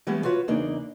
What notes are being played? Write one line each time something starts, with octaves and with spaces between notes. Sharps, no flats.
E3 G3 G#3 B3 C#4
F4 F#4 B4 C#5
E2 C#3 A#3 D4 D#4